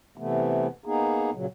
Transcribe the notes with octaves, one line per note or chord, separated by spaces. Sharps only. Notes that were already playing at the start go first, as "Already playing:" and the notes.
C3 E3 A3 B3
A#3 B3 D#4 G#4
A#2 C#3 F#3